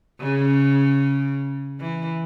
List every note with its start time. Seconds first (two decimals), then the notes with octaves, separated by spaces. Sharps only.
0.21 C#3
1.80 E3